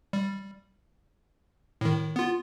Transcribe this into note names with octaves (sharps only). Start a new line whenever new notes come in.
G3
A2 D#3
B3 F4